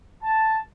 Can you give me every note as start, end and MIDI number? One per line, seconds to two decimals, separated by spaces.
0.23 0.59 81